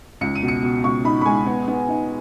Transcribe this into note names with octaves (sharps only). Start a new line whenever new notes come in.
C#2 C#7
D#7
B2
C#7
B2
C#2 C#6
D#4 B5
B5
G#3 G#5
B3
B3
D#4